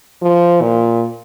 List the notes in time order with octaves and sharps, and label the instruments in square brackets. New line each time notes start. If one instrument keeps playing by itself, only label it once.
[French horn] F3
A#2